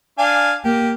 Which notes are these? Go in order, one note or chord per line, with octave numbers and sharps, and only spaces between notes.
D4 F5 G#5
A#3 G4